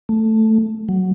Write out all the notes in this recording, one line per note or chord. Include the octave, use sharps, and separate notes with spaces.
A3
F#3